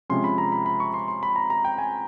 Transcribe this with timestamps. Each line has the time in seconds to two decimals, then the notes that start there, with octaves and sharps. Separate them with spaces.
0.09 C3 F3 G#3 C#4 C6
0.24 B5
0.38 A#5
0.52 B5
0.66 B5
0.80 C#6
0.94 C6
1.08 C6
1.23 B5
1.36 A#5
1.50 A#5
1.65 G5
1.78 G#5